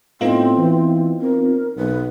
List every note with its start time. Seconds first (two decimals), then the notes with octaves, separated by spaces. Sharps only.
0.21 A2 B3 C4 D#4 F4
0.57 E3
1.21 C4 A#4
1.77 B1 B4